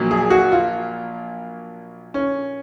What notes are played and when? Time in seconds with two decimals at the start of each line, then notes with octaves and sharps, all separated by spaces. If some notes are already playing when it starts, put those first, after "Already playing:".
Already playing: A#1 A#2 F#3
0.11 G#4
0.30 F#4
0.52 F4
2.14 C#4